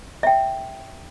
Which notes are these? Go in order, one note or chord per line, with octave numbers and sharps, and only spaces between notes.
E5 G5